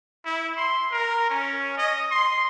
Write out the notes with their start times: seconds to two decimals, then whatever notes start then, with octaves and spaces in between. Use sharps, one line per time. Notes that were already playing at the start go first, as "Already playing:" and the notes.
0.25 E4
0.57 C6
0.91 A#4
1.30 C#4
1.77 D#5
2.11 C6